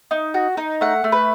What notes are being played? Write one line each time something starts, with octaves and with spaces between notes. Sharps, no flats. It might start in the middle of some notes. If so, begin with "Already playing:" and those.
D#4
F#4
D#4
A3 F#5
A3
B4